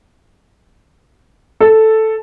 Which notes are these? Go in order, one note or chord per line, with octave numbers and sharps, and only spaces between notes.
A4